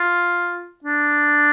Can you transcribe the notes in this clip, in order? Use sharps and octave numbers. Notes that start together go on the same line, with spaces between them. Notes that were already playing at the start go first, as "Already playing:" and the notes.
Already playing: F4
D4